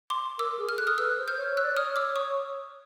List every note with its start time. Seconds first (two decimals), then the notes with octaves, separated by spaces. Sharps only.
0.10 C6 D6
0.39 A#4 D6 E6
0.58 G#4
0.69 F6
0.78 A4 F#6
0.87 D#6 F6
0.98 B4 E6 F#6
1.18 C5
1.28 F6 G6
1.37 C#5
1.57 C#5 E6 F#6
1.64 D5
1.71 C#5
1.77 D#6 F6
1.96 D6 E6
2.16 C#6 D#6